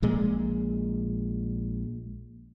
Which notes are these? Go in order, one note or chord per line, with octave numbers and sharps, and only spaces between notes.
A#1 A#2 G#3